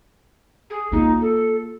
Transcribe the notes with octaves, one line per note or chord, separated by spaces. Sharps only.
G#4
A#3 D#4 F4
A4